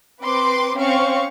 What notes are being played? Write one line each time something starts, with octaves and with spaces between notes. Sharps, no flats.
C4 B4 C6 D6
C4 C#4 F5 C#6